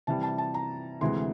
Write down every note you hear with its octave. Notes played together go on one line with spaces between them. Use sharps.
C3 E3 G3 A5
A5
A5
A#5
D2 C3 E3 G#3 C6